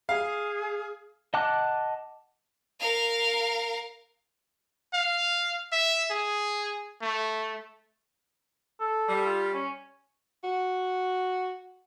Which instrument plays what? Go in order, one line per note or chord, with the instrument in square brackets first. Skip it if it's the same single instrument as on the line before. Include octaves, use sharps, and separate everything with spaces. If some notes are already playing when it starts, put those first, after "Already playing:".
[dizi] G#4 [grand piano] F5
[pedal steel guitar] D#5 F#5 A5 D6 F#6
[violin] A#4 F5
[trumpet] F5
E5
G#4
A3
[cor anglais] A4
[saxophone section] G3
[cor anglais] F4
C#4
[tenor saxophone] F#4